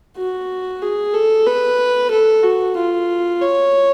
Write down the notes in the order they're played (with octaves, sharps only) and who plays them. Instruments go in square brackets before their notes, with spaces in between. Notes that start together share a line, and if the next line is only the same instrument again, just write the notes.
[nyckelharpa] F#4
G#4
A4
B4
A4
F#4
F4
C#5